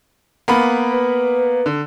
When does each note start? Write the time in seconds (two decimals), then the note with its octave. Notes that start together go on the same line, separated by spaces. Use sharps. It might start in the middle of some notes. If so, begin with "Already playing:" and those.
0.48 A#3 B3 B5
0.92 B4
1.66 D3